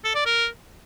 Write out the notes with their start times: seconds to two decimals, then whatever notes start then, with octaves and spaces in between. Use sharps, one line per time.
0.04 A4
0.15 D5
0.26 A#4